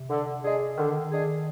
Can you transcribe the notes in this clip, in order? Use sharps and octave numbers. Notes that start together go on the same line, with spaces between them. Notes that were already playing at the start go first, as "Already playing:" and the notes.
Already playing: C3
D3
G#3 D4 G#4
D3 D#3
G#3 D4 G#4